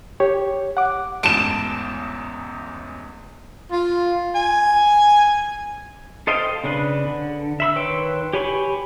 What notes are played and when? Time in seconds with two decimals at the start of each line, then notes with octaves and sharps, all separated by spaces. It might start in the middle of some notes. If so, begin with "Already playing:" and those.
0.20 G4 C#5
0.77 F#5 D6
1.23 A1 E2 G#2 A5 D7 E7
3.72 F4
4.35 G#5
6.27 A4 C5 D#5 F5 G5
6.64 C#3 D4 B4
7.06 D3
7.60 E5 B5 E6
7.76 D#3 B4 C#5 G5 C6
8.33 G4 C#5 G#5 B5 C#6